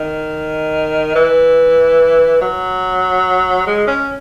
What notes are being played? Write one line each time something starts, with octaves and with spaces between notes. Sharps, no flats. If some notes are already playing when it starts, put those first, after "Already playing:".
Already playing: D#3
E3
F#3
G#3
C#4